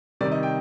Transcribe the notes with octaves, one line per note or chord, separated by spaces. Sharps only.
C3 D#3 G3 D5
D#5
G5